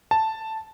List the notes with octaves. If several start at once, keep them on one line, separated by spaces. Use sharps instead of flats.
A5